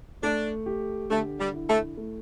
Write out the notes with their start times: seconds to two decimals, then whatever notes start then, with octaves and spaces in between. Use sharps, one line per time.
0.23 A3 D4
0.66 G4
1.10 D3 A3
1.39 G3
1.54 E4
1.68 A3
1.97 A3